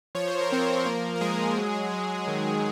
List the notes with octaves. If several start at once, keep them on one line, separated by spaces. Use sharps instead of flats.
F3 C#5
C5
A#4
F3 C4 C5
F3 A#3 A#4
A#4
F3 G#3 G#4
F#3
F#3
D#3